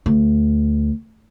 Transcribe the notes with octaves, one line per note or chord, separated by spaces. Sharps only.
D2